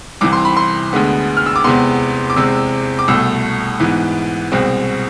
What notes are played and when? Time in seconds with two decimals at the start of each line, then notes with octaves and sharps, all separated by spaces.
0.21 C2 C3 E3 D6
0.33 C6
0.45 B5
0.57 C6
0.93 D2 D3 G#3 B3
1.37 F6
1.46 E6
1.56 D6
1.64 E2 C3 G#3 B3 C6
2.30 D6
2.36 E2 C3 G#3 C4 E6
2.99 D6
3.08 C2 B2 A3 E6
3.80 G#2 E3 B3
4.52 C2 B2 G#3 C4